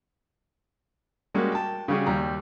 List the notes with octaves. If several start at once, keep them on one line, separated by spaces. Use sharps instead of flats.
G3 G#3 A#3 C#4 F#4
G5 A5
C#3 G3 C#4 F#4 G#4
D#2 G3 A#5